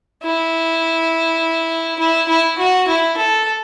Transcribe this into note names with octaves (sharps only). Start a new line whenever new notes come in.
E4
E4
E4
F#4
E4
A4